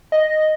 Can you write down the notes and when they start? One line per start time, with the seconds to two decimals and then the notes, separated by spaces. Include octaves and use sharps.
0.12 D#5